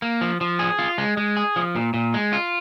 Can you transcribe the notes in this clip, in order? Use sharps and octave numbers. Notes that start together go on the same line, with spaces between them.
A#3
F3
F3
G#4
F4
G#3
G#3
G#4
F3
A#2
A#2
G#3
F4